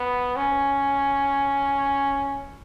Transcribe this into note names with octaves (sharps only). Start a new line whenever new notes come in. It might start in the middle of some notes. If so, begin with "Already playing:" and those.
Already playing: B3
C#4